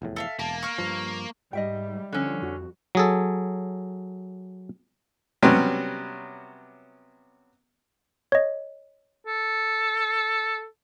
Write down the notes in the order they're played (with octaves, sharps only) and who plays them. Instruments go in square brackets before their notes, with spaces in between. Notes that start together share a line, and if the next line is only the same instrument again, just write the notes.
[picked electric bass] F1 E2 A2
[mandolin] A4 E5 F5
[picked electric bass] E1 [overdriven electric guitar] A#3 [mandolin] A5
[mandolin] C#6 F6
[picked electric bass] G2 F3
[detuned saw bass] G#2 [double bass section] G3 [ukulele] D#5 E5 G5
[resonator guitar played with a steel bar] D3 C#4 [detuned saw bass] F3
[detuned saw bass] F2 [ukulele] F#4
[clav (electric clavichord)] F#3 G#4 A4
[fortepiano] C3 F#3 G3 B3 C#4
[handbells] C#5 D#5
[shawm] A4